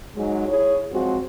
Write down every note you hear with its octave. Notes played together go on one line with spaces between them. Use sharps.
G#2 F#3 G#3
E4 G#4 C#5
F3 F#3 G#3 C4 F#4